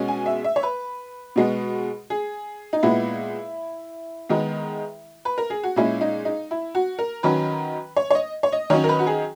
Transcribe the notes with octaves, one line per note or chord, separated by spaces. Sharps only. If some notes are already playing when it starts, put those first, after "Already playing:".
Already playing: B2 G#3 C#4
G#5
E5
E5
C#5
B4
B2 G#3 B3
G#4
D#4
A#2 G#3 B3 E4
D#3 G#3 B3
B4
A#4
G#4
F#4
A#2 G#3 C#4 E4
D#4
D#4
E4
F#4
A#4
D#3 F#3 C#4 B4
C#5
C#5
D#5
C#5
D#5
D#3 F#3 C#4 C#5
A#4
B4
F#4
G#4